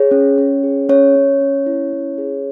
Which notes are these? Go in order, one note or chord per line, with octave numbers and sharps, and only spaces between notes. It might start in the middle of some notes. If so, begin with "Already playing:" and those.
Already playing: G#4 C#5
C#4
C#4
G#4
C#4 C#5
C#4
C#4
E4
C#4
G#4